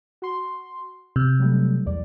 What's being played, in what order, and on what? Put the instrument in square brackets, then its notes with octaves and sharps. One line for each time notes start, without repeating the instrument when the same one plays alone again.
[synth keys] F#4 C6
[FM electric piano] C3 [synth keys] F6
[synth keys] F#3 G3 A3
B1 E2 D5